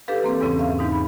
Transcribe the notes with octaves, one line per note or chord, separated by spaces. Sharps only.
D4 G4 A4 B4 F5
E3 A#3 C4
E2 G#2 C#3 C#4
E5 F5
E2 G#2 D#4
B5